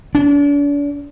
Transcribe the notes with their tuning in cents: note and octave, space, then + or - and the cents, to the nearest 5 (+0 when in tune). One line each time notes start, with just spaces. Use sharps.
D4 -40